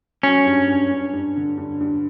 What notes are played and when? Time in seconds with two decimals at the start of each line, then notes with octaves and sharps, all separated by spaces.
0.23 F#3 C#4
0.45 G2
0.68 G2
0.91 G2
1.13 G2
1.36 D3
1.58 G2
1.80 G2